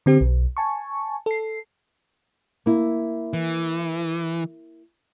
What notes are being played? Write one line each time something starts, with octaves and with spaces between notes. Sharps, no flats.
D3 C4 G4
B1
G#5 A5 C#6
A4 C7
A#3 E4
E3